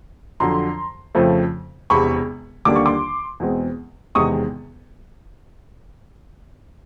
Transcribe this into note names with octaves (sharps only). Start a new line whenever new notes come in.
F2 D3 F#3 A#5 C6
F2 C#3 F3 A3 C4
E1 E2 C3 B5 C#6
D#2 D3 G3 A#3 D4 D6
C#6
C6 D6
E2 B2 G#3 C4
E1 E2 C3 D#3 G#3 C#6 D#6